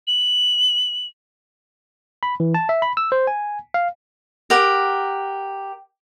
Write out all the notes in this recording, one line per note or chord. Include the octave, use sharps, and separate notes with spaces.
F#7
B5
E3
A5
E5
B5
E6
C5
G#5
F5
G4 A#4 F#5